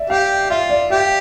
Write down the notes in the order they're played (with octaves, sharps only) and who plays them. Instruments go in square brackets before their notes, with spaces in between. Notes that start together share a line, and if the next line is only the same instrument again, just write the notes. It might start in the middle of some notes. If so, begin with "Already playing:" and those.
Already playing: [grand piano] D5 E5
[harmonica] G4 [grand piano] F5
[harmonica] F4 [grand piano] E5
[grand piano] D5
[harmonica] G4 [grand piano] E5